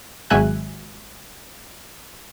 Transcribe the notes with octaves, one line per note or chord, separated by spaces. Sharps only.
G#1 F#3 G#3 E5 G#5 F#6